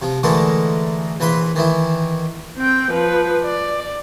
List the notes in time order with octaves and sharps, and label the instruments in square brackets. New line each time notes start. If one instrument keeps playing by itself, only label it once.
[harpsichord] C3 F3
D3 E3 G#3 A3 A4 A#4
A#1 E3 B4 B5 C6
D#3 E3 E4
[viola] C4 G5
F3 B4
D5